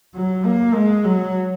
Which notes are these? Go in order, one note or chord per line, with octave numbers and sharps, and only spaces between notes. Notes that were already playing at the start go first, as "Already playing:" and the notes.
F#3
A#3
G#3
F#3